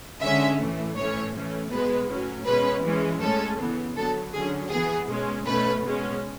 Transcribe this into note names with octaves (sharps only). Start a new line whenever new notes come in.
D3 G#3 C#4 E5
A2 E3 A3
A2 E3 A3 C#4 C#5
E3 A3 C#4
B2 G#3 B3 B4
A2 F#3 C#4
B2 G#3 C#4 B4
E3 G#3 C#4
A2 G#3 C#4 A4
C#3 E3 B3
D3 F#3 B3 A4
D3 F#3 C#4 G#4
E3 B3 G#4
B2 G#3 C#4
B2 A3 C#4 B4
B2 G#3 C#4